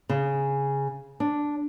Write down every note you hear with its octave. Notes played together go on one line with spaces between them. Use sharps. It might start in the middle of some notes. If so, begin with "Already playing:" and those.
C#3
D4